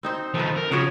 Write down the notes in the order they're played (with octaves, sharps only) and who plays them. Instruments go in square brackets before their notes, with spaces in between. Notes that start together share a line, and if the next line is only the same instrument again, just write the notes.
[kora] C4 D#4 C5
[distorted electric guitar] D#3 F3 [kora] A4 B4
[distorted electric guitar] A#4
[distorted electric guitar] C#3 [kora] F3 F#4 C#5